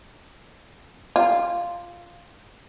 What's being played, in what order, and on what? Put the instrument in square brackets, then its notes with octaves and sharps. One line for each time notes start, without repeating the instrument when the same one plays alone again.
[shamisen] F4